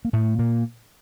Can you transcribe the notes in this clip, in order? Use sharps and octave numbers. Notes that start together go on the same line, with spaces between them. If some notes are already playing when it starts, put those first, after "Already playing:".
A#3
A2 A3
A#2 A#3